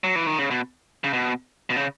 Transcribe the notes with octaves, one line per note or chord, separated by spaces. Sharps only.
F#3
E3
D#3
C#3
B2
C#3
B2
B2
C#3